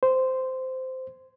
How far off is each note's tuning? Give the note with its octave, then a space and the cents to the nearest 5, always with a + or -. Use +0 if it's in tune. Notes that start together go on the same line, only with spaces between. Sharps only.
C5 -10